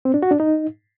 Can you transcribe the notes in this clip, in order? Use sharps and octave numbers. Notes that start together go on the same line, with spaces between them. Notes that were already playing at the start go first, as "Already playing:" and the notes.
C4
D4
F#4
D4
D#4